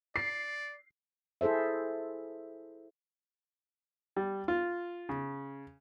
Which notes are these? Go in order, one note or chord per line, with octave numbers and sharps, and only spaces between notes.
D5 C7
E4 G#4 A4 C5 E5
G3
F4
C#3